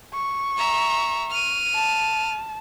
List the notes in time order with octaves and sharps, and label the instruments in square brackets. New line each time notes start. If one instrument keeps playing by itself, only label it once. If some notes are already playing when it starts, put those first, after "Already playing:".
[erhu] C#6
[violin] E5 A#5
F6 D#7
[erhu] A5